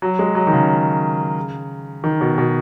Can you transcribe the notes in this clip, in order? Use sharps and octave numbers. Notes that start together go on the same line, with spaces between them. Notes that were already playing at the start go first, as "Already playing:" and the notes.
F#3
G#3
F#3
D#3
C#3
D#3
B2
B2